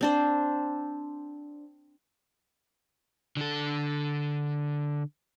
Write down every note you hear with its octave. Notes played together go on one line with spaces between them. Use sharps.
C4 D4 C5
D3 A4